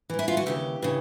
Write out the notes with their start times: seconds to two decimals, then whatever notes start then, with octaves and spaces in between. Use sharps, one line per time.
0.10 G#2 E3
0.19 E4
0.28 F4
0.37 F#4
0.46 D#2 C#3 E3 G4
0.82 C#3 E3